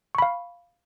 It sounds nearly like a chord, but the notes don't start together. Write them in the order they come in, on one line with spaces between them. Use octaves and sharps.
C#6 B5 F5